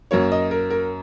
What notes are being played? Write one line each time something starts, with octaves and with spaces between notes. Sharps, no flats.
F#2 F#3 A#3 C#5
D#5
A#4
A#4